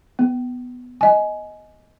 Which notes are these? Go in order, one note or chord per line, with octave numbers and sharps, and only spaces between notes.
B3
D#5 G#5